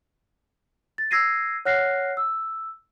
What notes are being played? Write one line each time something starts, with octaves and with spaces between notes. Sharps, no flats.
A6
E6 G#6 A#6 C7 D#7
C#5 F#5 F6 F#6 A#6 C7
E6